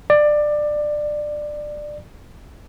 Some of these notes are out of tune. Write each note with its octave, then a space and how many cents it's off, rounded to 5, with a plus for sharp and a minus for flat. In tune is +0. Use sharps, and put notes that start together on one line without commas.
D5 +20